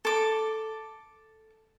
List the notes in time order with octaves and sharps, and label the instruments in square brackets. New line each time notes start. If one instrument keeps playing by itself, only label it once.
[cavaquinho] A4 D6